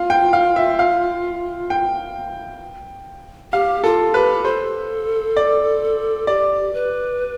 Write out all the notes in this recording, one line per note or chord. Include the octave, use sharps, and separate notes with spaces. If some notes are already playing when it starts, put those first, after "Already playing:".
Already playing: F4 F5
G5
F5
E5
F5
G5
G4 F5
F4 A4
G4 B4
A4 C5
D5
G4 D5
B4